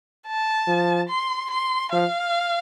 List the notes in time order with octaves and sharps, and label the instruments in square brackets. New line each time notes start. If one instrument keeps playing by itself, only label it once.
[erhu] A5
[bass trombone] F3
[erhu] C6
C6
[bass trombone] F3 [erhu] F5